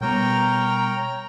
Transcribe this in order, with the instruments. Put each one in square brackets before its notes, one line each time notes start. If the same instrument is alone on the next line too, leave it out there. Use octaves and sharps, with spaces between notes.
[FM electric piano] B2 G3 B3 [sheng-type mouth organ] A#4 C#5 G5 [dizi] A#5